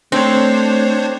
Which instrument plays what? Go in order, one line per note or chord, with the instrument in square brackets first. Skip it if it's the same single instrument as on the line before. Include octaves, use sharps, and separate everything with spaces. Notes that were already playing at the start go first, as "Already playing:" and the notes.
[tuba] A3 [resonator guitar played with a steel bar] C4 [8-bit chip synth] D4 C5 C#5